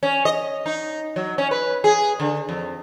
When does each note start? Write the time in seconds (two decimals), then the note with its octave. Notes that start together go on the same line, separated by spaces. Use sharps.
0.03 C#4
0.25 D#5
0.66 D#4
1.16 F#3
1.38 C#4
1.51 B4
1.84 G#4
2.20 D3
2.49 F2